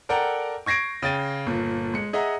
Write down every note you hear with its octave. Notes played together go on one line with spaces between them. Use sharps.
A4 A#4 D5 F#5 G5 A#5
C#6 G#6 A#6 C7 D7
C#3 G5 A6 D#7
G1 A#2
G#3 C#7
G#4 D#5 E5 F#5 A#5